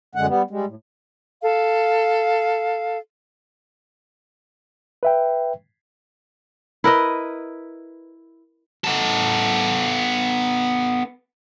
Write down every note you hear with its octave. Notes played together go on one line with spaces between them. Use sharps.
F#2 D3 G#3 F#5
G3 B3
G3 G#3
A2
A4 F5
B4 E5 G5
E4 A#4 B4 D#5
B3 A4